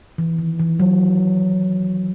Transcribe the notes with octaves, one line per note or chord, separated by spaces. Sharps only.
E3
D#3
E3
F#3